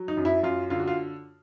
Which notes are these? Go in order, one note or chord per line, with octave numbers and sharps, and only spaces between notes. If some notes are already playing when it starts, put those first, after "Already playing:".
Already playing: F#3
D#4
F#2
E4
F#2 F4
D3 F4
F#4
F4